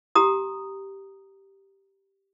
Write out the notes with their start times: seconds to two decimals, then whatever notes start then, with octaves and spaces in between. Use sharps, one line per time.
0.15 G4 A#5 D#6